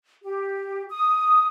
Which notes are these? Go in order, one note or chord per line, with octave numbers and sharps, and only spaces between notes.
G4
D#6